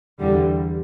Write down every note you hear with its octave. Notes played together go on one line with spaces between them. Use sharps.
E2 D3 G3